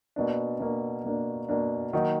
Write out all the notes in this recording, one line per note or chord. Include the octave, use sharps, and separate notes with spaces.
B2 A#3 D4
B2 A#3 D4
B2 A#3 D4
B2 A#3 D4
D#3 F#3 A#3 D#4